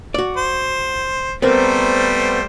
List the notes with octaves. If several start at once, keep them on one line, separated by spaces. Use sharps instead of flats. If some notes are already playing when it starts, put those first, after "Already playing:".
F#4 D5
C5
G3 A3 B3 C4 A#4 C5